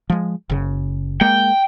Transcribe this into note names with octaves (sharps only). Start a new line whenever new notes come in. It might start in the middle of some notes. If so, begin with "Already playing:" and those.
F3 G#3
F#1 C#3
G#3 A#3 G5